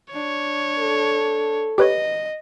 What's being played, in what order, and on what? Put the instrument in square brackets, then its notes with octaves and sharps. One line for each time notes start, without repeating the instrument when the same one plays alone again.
[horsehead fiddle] D4 [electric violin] C#5
[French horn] A4
[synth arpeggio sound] G4 B4 C#5 [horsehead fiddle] D#5